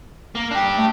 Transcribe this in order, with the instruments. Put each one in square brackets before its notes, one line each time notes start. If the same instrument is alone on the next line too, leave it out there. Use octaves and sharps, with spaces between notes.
[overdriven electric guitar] A#3
D4 G4
[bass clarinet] A3